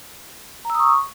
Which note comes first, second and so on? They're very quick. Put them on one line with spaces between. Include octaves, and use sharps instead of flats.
A#5 E6 D#6 C#6